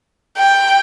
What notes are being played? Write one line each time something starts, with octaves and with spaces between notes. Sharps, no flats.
G5